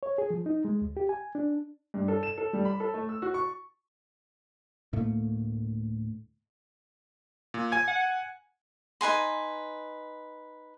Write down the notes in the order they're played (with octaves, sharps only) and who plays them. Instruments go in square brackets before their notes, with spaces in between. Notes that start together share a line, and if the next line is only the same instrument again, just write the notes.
[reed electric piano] C#5
G#4
F3
D#4
G#3
D2
G4
G#5
D4
[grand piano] G2
A4
E7
A4
G3
B5
A4
A3
E6
F#4
C#6
[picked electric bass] D2 A2 A3 A#3
[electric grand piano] A#2
G#5 G#6
[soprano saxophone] F#5
[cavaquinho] D#4 B4 G#5 C6